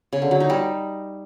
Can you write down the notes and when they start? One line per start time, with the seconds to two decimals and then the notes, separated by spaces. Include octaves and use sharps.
0.13 C#3
0.22 D3
0.31 F#3
0.40 D#4
0.50 G3